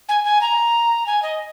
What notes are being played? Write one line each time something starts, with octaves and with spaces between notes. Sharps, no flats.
G#5
G#5
A#5
G#5
D#5